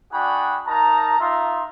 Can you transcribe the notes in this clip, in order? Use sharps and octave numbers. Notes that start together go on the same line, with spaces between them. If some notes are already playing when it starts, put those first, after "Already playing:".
D4 F#4 G#4 F#5 G5 B5
D#4 A#4 A5 A#5
D#4 F4 E5 F5 A#5 C6